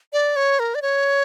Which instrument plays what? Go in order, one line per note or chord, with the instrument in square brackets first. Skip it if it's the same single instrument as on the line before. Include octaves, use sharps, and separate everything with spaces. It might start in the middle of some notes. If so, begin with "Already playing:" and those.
[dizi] D5
C#5
A#4
D5
C#5